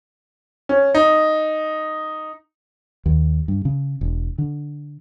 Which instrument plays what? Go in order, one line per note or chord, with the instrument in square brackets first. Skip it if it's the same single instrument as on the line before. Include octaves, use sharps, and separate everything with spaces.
[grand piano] C#4
D#4
[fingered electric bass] D#2
G2
C#3
E1
D3